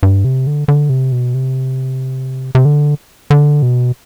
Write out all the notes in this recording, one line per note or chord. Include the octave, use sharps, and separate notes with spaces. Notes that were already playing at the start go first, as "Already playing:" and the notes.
G2
C3
D3
D3
C3
B2
C3
C3
D3
D3
B2